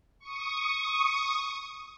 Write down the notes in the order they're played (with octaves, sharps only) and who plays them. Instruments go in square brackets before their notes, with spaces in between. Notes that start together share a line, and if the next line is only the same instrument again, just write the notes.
[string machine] C#6 D#6